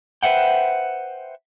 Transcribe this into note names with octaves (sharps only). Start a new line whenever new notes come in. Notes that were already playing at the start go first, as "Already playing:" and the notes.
B4 C5 E5 F#5 G5